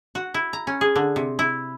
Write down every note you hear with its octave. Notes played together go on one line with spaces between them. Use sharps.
F#4
E4
A#5
C#4
G#4
D3
C3
E4